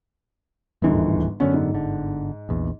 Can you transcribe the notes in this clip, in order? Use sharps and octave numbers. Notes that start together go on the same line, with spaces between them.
D1 G1 D#2 G#2 D3 E3
F#2 D3 B3 C#4
G#2
G1 D3
A#1 E2